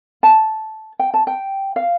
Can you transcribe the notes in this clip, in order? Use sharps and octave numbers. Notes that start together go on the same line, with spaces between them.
A5
G5
A5
G5
F5